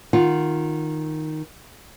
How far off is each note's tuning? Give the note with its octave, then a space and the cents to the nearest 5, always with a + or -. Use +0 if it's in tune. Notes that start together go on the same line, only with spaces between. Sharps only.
D#3 +0 F4 +0 F#5 +0